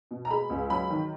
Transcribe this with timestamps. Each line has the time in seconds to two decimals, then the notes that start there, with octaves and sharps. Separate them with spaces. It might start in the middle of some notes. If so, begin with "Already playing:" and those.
0.11 B2
0.25 A#5
0.31 G#3 B5
0.50 C#2
0.70 F#3 B5
0.90 D#3